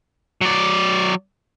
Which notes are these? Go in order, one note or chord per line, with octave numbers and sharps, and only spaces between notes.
F#3 D5